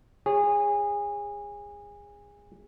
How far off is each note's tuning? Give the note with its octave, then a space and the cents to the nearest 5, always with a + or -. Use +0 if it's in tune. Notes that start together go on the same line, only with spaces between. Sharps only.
G#4 -25 C#5 +0